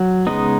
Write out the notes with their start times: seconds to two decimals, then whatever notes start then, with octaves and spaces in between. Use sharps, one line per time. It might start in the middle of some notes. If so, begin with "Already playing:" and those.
Already playing: F#3
0.27 C#3 G#3 B3 D#4